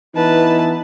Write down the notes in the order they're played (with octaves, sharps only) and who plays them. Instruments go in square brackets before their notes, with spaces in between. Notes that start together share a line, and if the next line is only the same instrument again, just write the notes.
[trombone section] E3 B3 D#4 [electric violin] B4 A5